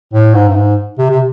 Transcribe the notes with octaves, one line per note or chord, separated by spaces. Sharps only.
A2
G#2
G2
G#2
C3
C3